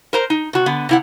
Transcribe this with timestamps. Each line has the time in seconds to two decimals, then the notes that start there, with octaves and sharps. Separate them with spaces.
0.13 A#4 C5 A#5
0.30 D#4
0.53 C3 F#4
0.66 D3 B3
0.89 C3 E4 F#5